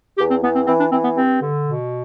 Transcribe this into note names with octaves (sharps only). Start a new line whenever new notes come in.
E2 G4
C4
E2 B3
C4
E3 C4
D4
E3 C4
B3
G2 C4
D3
B2